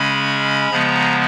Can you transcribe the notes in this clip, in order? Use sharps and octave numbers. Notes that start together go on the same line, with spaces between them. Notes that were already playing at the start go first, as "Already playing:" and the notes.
Already playing: C#3 G#3 C#4 B5
C#3 F3 G#3 B3 A#5